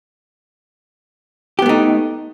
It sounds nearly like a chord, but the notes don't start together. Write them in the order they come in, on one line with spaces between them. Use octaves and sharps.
G4 B3 A3 D#4